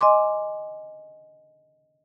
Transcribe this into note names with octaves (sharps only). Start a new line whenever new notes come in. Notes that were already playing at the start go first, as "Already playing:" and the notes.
D#5 G#5 C6 D6